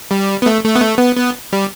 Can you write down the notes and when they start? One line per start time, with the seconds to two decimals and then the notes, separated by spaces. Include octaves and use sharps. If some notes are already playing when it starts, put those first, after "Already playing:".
0.11 G3
0.42 B3
0.46 A3
0.65 A3
0.75 B3
0.82 A3
0.99 B3
1.17 B3
1.53 G3